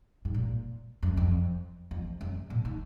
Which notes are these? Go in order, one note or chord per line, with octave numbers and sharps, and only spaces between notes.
G#2
A#2
F#2
F2
F2
F#2
A#2
D#3